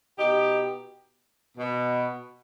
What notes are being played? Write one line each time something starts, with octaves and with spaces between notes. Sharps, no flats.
B2 D#4 G4
B2